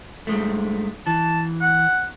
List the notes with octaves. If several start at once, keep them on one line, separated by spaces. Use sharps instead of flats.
G2 G#3 A3
E3 A5
F#5